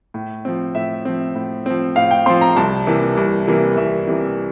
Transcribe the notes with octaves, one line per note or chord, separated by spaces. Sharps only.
A2
F3 C4
A2 E5
F3 C4
A2
F3 C4
A2 F5
G5
F3 C4 C6
A#5
C2 A5
C3 E3 A#3
C2
C3 E3 A#3
C2 E5
C3 E3 A#3